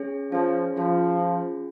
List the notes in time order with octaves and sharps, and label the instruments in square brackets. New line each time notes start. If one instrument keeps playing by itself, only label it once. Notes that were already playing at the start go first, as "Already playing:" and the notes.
Already playing: [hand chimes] C#4 G#4 C#5
[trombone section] F3 [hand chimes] C#4 G#4 C#5
[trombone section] F3 [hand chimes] C#4 F4 G#4
[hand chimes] C#4 F4 G#4